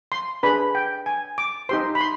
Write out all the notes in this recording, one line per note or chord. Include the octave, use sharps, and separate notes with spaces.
C6
D4 G#4 B4 B5
G5
G#5
D6
D#4 G4 C5 C6
B5
C6